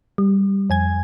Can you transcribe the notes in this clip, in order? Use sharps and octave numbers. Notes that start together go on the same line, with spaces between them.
G3
F2 G#5 G#6